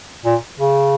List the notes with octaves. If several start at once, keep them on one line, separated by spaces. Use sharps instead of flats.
A#2
C#3